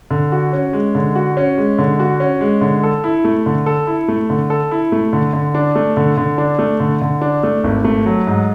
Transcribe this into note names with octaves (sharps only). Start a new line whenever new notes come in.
D3
F#4
C#4
G#3
D3
F#4
C#4
G#3
D3
F#4
C#4
G#3
D3
A4
E4
A3
D3
A4
E4
A3
D3
A4
E4
A3
D3
D3
D4
A3
D3
D3
D4
A3
D3
D3
D4
A3
G#1
A3
F#3
G#2